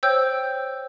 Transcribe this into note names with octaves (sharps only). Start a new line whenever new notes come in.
C5 C#5 G5 E6 G6